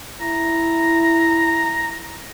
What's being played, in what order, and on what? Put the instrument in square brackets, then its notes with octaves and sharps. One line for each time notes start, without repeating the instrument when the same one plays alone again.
[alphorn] E4 [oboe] A#5